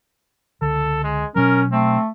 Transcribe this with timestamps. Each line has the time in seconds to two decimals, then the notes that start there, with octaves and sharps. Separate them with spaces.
0.62 C#2 D3 A4
1.04 G#3
1.36 B2 F#3 C#4 A#4
1.72 A3 C4